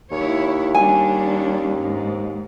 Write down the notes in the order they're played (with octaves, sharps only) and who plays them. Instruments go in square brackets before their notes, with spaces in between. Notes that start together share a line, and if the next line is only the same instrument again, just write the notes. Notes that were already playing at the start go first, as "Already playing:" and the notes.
[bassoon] D#2 [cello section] E4 C#5
[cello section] G3 C#4 D4 [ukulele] G#5
[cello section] G#2